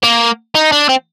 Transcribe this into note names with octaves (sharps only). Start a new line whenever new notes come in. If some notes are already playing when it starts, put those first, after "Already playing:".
A#3
D#4
D4
C4